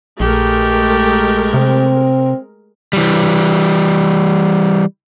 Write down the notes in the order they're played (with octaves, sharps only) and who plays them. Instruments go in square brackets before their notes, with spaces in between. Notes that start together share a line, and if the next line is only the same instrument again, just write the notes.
[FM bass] A#1 [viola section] G#3 A#4 [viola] A3 G4
[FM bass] C3 [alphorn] C4
[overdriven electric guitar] E3 G3